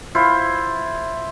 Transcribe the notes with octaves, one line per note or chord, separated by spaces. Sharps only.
E4 F4 C5